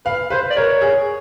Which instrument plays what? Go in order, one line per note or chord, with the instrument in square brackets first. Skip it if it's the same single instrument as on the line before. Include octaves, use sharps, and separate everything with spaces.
[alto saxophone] B4 [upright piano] F5
[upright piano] B4 [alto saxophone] C5
[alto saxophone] D5
[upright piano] A#4 [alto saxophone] C#5
[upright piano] G#4